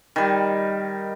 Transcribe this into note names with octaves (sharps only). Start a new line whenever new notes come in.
D#3 G3